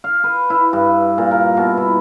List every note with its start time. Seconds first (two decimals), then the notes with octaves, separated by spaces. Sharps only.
0.04 F5
0.24 B4
0.50 E4
0.73 G2
1.18 A#2
1.31 A#4
1.57 B2
1.77 E4